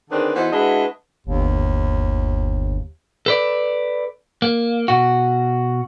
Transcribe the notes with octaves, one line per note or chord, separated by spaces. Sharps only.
D3 D#3 C4 D4 G#4 B4
E3 B3 D#4 F#4 A4 C5
G#3 D4 E4 F#4 B4 D#5
G1 D#2
A4 B4 D5
A#3
B2 F#4